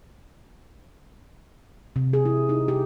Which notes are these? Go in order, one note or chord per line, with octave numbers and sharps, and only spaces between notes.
C3
G#4
E4
D#4
G4